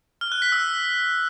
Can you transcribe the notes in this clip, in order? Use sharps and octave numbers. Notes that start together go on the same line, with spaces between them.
F6
F#6
B6
E6